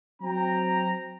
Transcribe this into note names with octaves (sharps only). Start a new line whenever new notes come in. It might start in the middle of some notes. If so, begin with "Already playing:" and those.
F#3 C4 G5 A#5